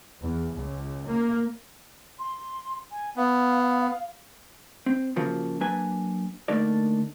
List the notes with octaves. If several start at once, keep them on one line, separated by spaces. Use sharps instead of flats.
E2
C#2
A#3
C6
G#5
B3 F5
C4
C#3 F3 A#3 F#4
F#3 A#3 D4 B4 G#5
D3 A3 A#3 D4 D#4 D5